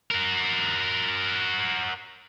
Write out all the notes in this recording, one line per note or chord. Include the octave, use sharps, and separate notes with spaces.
F#4 A#4